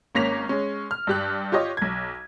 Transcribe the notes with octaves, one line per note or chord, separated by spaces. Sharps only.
G#1 A#3 C#4 A#6 B6 F7
G#3 C#4
F6
G2 G4 F#6
F4 G4 C#5 D#5
B1 G#6